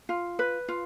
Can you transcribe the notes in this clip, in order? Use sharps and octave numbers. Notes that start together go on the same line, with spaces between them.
F4
B4
F4